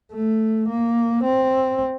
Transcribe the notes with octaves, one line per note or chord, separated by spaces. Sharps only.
A3
A#3
C4